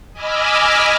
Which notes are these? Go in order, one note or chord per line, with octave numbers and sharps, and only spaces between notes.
D#5 G#5 B5 D6 E6 F6